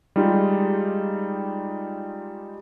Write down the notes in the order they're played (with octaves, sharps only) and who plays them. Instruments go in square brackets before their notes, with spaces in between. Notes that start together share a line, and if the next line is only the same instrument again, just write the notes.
[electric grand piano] G3 G#3 D#4 F4 G4